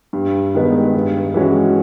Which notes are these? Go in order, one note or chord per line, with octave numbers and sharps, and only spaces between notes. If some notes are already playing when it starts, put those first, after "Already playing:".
G2
D#3 G#3 B3 D#4
G2
E3 G#3 C#4 F#4